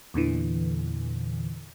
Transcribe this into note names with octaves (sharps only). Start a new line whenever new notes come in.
E2 A#2 D3 E3